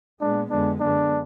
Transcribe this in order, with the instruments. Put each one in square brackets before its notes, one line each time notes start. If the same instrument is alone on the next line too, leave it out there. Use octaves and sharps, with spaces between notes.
[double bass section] A#2 G#3 B3 [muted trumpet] D4
[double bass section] F2 D3 G#3 B3 [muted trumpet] D4
[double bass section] F#2 D3 G#3 B3 [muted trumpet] D4